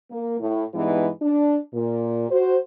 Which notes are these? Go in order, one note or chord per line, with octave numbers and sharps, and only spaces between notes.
A#3
A2
G2 E3 G#3 B3 D#4
D4
A#2
F#4 C5